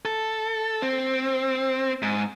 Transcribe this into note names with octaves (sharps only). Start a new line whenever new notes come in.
A4
C4
G#2